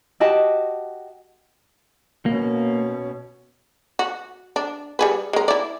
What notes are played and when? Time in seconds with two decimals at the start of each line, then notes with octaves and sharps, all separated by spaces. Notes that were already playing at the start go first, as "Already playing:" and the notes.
0.20 F#4 G4 D#5 A5
2.26 B2 A#3 C#4
3.99 F#4
4.56 D4
4.99 G3 G#4 B4
5.33 G#3 A#4
5.48 E4 D5